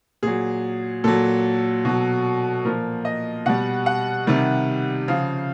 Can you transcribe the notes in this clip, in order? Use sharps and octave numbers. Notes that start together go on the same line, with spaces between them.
A#2 F#3 G#4
A#2 F#3 A4
B2 F#3
A#2 F3 A#4
D#5
B2 G3 F#5
F#5
C3 D#3 G3
C#3 F3 F5